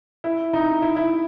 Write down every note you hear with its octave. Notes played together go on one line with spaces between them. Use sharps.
E4
D#4
E4
E4